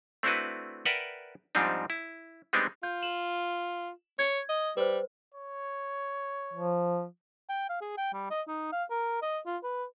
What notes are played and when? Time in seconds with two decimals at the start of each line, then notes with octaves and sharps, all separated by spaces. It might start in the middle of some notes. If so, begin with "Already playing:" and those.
0.23 A3 C4 D4 E4 F#4 B4
0.85 A#4 B4 D5 E5 F#5 G5
1.55 G#2 F3 G3 C4 D4 D#4
1.90 E4
2.53 G3 G#3 B3 C4 D4 D#4
2.83 F4 G6
3.02 E7 F#7
4.19 C#5 G#6
4.49 D#5
4.77 G3 B4 C5
5.35 C#5
6.53 F3
7.49 G5
7.70 F5
7.81 G#4
7.97 G5
8.14 G3
8.31 D#5
8.48 D#4
8.72 F5
8.90 A#4
9.22 D#5
9.46 F4
9.63 B4